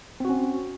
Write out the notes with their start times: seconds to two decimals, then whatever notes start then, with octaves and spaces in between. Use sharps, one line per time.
0.20 C4
0.25 F#4
0.29 C#4